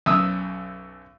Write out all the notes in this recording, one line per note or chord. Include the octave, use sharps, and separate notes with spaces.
B1 F#2 E5 D#6 E6